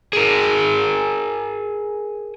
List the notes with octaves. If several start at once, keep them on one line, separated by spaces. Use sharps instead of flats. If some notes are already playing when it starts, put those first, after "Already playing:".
G#4 A#4